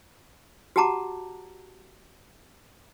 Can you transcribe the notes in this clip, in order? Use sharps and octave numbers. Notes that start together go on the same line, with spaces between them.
F#4 G4 F#5 A5 A#5 D6